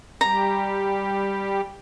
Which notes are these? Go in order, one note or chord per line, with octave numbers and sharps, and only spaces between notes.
G3 G4 A#5